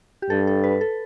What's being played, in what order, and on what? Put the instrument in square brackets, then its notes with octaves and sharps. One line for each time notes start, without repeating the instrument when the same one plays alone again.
[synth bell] G4
[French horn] G2 [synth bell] A4
[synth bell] A4
B4
A4